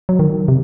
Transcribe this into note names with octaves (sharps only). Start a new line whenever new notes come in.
F#3
D#3
C3